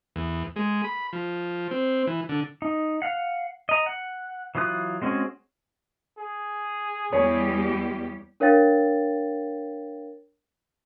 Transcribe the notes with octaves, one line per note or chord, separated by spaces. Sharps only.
E2
G#3
B5
F3
C4
E3
D3
D#4
F5 F#5
D#5 A#5
F#5
E3 F#3 F4 D#6 F#6
G#3 C4 C#4 F#4 G#4
G#4
E2 G3 G4 C#5
D4 A#4 C#5 F5 G5 A6